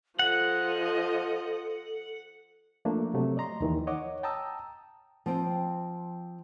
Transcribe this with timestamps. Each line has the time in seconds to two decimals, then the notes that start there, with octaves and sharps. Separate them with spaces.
0.19 F3 A4 D#5 F#5
2.85 F3 A3 A#3 D4
3.14 C3 F#3 A3
3.37 D5 D#5 A#5 C6
3.61 D#2 D#3 E3
3.87 C#5 D#5 F#5 D6
4.23 G5 A5 A#5 D#6 E6
5.26 F3 C4 G5